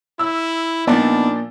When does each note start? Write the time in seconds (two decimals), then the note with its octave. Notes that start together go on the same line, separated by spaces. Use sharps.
0.19 E4 E6
0.87 A#2 F3 B3 D4 D#4